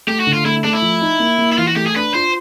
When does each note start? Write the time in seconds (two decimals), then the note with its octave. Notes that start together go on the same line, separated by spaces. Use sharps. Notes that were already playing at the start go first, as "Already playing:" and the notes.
0.07 A3 G4
0.20 F#4
0.27 D3
0.33 F4
0.45 A3 E4
0.64 A3 D4
0.73 E4
0.82 F3
1.01 D#4
1.20 A#3
1.38 A#3
1.52 E4
1.58 E3 F4
1.68 F#4
1.76 A3 G4
1.86 G#4
1.96 D4 B4
2.14 F4 C5